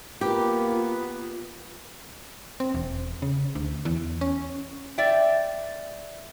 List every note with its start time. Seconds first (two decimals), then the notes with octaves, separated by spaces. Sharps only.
0.21 A#3 B3 F4 G4
2.60 C4
2.74 E1
3.22 C#3
3.55 D2
3.85 E2
4.21 C#4
4.98 D5 E5 G5